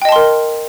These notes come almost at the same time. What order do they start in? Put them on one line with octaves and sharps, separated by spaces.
G5 D#5 A5 C6 A#4